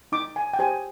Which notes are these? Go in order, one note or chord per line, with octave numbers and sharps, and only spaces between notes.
D#4 D6
G#5
G5
G4 C5 G#5